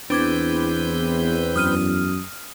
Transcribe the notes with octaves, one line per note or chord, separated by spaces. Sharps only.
E2 C4 D4 B4 D6 G6 G#6
F#2 D#6 F6 D#7